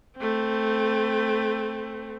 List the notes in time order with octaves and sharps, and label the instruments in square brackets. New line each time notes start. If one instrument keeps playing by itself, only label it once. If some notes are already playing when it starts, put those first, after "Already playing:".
[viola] A3 C4